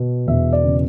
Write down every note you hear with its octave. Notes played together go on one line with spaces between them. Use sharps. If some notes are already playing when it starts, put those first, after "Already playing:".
Already playing: B2
E1 E5
D5
C#3